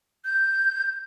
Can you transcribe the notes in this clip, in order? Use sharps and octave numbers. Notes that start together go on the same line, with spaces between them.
G6